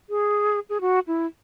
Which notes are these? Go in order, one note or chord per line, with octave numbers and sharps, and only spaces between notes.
G#4
G#4
F#4
E4